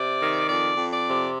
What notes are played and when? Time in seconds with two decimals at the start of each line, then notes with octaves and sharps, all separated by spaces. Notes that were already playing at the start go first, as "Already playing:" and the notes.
Already playing: C3 D5
0.21 D#3
0.49 F2 D5
0.77 F2
0.91 D5
1.05 C3